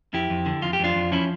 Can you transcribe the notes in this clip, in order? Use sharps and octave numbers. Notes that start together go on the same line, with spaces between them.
F2 E4 G4
F2
D3
F2 F4
G4
F2 D4 F4
F2
F3 C#4 E4